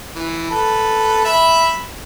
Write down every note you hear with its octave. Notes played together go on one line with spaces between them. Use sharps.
E3
A4 B4
E5 B5